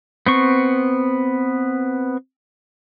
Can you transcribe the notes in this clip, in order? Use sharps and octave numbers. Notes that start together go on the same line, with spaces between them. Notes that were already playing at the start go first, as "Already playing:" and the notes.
B3 C4 C#6